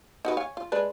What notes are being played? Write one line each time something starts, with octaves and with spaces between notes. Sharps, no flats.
D#4 F#4 B4
C#5 F5 G#5
F4
G#3 D4 B4